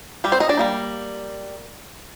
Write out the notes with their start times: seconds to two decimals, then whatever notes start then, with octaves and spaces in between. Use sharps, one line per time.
0.24 G3 G4
0.32 C4 C5
0.40 D#4 D#5
0.49 D4 D5
0.57 G3 A#3 D#4